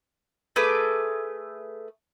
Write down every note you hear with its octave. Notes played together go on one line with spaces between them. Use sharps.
A3 G#4 B4 D6